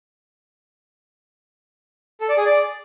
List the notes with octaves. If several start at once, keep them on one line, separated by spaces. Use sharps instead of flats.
A4
D5
G#4
D5